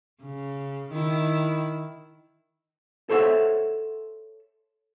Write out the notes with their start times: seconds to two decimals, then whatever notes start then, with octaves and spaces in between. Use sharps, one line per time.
0.23 C#3
0.91 D#3 E4
3.09 A4 C5 C#5 E5 F#5